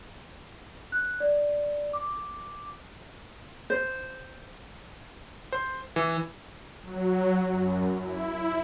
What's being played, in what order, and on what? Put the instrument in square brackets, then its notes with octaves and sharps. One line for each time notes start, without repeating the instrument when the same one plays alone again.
[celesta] F#6
D5
D6
[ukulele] C5
[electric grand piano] C5
E3
[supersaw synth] F#3
F#2
E4